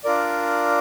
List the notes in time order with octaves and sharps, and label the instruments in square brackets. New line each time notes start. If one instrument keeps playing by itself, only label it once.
[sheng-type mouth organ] D4 F4 A#4 D5